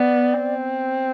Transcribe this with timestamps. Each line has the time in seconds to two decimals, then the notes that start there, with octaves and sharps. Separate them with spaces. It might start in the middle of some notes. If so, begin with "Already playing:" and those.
Already playing: B3 D5
0.40 C4